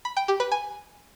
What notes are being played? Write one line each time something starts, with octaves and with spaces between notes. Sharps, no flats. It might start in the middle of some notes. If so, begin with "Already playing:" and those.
B5
G5
G4
B4
G#5